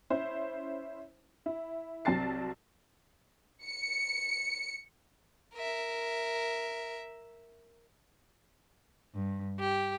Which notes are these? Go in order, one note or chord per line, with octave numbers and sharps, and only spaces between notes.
C#4 E4 C5
E4
C2 F#3 C4 A5 A6 C7
C#7
A#4 E5
G2
G4